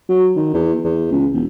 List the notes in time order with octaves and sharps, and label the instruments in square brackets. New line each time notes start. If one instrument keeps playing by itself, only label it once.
[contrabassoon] F#3
D#3
E2
E2
C#2
E1